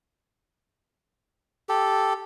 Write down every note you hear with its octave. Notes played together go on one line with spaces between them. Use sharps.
G4 A4